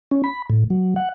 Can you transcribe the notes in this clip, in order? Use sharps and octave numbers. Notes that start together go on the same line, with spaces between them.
C#4
B5
A2
F#3
F#5